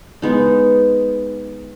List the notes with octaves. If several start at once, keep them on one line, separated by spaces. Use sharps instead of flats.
G#3 B3 D#4